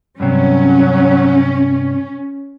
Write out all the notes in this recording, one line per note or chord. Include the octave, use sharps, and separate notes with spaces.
G2 C3 F#3 C#4